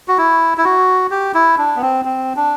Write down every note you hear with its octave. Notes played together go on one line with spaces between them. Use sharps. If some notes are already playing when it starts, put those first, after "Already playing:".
F#4
E4
E4
F#4
G4
E4
D4
B3
C4
C4
D4